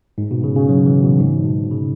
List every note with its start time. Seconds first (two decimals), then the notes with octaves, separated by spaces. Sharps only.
0.18 G#2
0.31 B2
0.44 C#3
0.56 C#3
0.69 F#3
0.86 E3
1.03 B2
1.20 G#2
1.45 B2
1.71 C#3